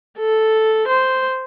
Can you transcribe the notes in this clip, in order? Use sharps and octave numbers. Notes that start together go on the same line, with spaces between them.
A4
C5